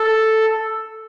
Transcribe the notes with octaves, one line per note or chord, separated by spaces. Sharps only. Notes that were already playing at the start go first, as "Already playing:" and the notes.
Already playing: A4